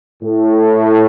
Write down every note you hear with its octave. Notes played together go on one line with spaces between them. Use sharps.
A2